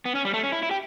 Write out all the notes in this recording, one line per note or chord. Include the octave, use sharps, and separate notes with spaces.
B3
C#4
G3
A3
C#4
E4
E4
G4